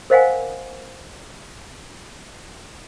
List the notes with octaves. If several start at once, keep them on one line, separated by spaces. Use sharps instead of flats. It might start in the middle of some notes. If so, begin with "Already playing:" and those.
A#4 C5 D#5 F5 F#5 G#5